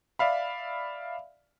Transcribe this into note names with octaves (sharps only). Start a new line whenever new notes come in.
D5 E5 F5 B5